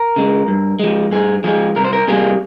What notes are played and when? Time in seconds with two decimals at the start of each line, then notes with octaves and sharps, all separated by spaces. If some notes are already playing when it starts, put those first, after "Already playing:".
Already playing: A#4
0.16 C#3 G#3
0.48 G2
0.79 F3 G#3
1.11 G2 G#4
1.44 F3 G#3 G#4
1.76 C2 A#4
1.84 C5
1.93 A#4
2.08 C3 G3 A#3 G#4